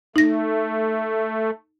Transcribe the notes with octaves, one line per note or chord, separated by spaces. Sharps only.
A3 D#4 A#6